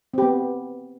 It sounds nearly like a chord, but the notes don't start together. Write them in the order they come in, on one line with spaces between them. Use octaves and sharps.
C4 G4 B3